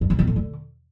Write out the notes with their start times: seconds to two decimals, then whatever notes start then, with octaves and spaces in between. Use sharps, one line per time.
0.01 G2
0.10 C#3
0.19 E2
0.27 A2
0.36 D3